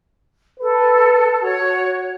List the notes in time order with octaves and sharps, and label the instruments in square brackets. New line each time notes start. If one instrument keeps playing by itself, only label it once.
[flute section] A4 [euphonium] B4
[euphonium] F#4 [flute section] C#5